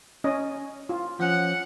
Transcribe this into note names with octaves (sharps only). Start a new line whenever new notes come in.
C#4 D#5
F4
F3 C#4 F#5